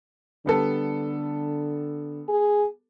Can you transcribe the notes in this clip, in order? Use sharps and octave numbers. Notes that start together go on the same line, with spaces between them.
D3 G3 B3 A4
G#4